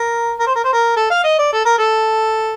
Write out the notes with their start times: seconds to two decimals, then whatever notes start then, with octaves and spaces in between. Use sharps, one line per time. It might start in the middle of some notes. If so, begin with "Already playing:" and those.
Already playing: A#4
0.39 A#4
0.47 C5
0.55 A#4
0.64 C5
0.73 A#4
0.96 A4
1.10 F5
1.24 D#5
1.38 D5
1.52 A4
1.65 A#4
1.78 A4